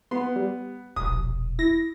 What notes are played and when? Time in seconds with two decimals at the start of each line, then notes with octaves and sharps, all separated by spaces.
0.11 B3 C6
0.36 G3
0.96 E1 A#1 D#6
1.59 E4 A#6